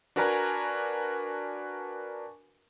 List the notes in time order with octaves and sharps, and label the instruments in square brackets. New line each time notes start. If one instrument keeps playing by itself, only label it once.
[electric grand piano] D4 F#4 A#4 B4 G#5 A#5